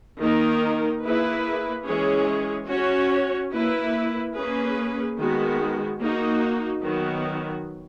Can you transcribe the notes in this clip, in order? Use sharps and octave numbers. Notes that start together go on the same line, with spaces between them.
D#3 A#3 D#4 A#4
A#3 E4 G#4 B4
E3 G#3 C#4 G#4 C#5
C#4 F#4 C#5
A#3 E4 B4
A#3 C#4 G#4 B4
D#3 G#3 B3 F#4
A#3 D#4 F#4
D#3 F#3 B3 F#4